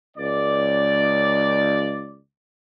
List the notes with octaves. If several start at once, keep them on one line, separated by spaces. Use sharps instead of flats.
C#2 D5